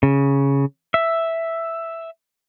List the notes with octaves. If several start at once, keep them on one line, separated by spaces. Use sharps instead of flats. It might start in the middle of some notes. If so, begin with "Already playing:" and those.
C#3
E5